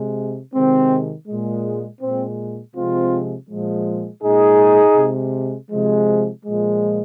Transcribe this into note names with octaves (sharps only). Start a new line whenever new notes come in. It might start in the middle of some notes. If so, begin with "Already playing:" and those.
Already playing: C3 G#3
C3 D#3 G#3 C4
A#2 G#3
A#2 G#3 C4
C3 F3 G#3 C4 F4
A#2 F3 G#3
A#2 G#3 D#4 G#4
C3 G#3
C3 F3 G#3
A#2 F3 G#3